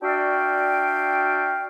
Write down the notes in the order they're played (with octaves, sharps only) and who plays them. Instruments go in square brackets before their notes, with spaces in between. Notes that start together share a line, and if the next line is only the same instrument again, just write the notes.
[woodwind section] D4 F#4 D5 E5 F5 G5